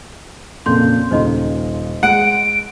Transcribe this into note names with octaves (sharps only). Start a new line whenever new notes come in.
F2 A#2 C#3 C6 G6
D#1 C#3 D#4 C5 D#5 C6
G#3 F#5 D7